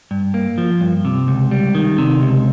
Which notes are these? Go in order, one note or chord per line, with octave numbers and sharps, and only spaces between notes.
G2
A#3
F3
G2
C3
C#2
G3
D#3
C3
C#2